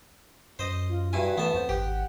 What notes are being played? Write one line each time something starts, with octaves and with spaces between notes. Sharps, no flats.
F#2 C5 D#5
F4
G2 E4 F#4 G#5
E3 A3 B3 A5
F2 C5
G#1 G4 F#5